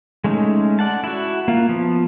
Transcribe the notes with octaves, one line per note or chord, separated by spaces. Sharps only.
G#3 A3 C#4 D#4
D5 F#5 A5
E4 F#4
A#3 F4
F3 B3